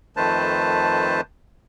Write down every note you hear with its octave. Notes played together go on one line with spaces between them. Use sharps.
F2 D#3 A3 B4 C5 A5